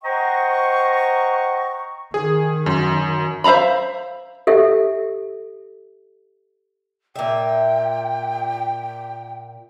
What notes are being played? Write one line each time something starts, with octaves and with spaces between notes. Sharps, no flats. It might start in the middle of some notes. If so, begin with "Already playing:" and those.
C5 D#5 F#5 G5 A#5 C#6
D#3 G#4
F#2
C5 E5 F5 A#5 B5
G4 A4 E5
A#2 E5 G5